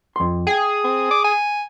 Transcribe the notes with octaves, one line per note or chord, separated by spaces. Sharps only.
F2 C6
G#4 G5
C4
D6
G#5